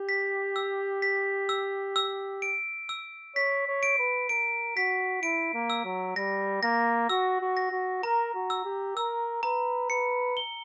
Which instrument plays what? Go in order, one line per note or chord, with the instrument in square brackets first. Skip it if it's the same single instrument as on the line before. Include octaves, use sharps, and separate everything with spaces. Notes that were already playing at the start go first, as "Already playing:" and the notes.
Already playing: [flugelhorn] G4
[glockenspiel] B6
E6
B6
E6
E6
D7
E6
[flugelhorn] C#5 [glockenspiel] B6
[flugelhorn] C#5
[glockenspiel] D7
[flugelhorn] B4
[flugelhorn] A#4 [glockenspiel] D7
[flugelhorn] F#4 [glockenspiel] B6
[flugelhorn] E4 [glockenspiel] D7
[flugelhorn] A#3
[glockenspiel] E6
[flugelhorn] F#3
[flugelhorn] G3 [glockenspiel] A#6
[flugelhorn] A#3 [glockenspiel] A#6
[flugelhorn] F#4 [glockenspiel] E6
[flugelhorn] F#4
[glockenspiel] A#6
[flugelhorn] F#4
[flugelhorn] A#4 [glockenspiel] A#5
[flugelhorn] F#4
[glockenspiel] E6
[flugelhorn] G4
[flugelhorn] A#4 [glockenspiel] E6
[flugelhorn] B4 [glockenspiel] A#5
[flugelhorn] B4 [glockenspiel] C#7
[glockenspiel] G7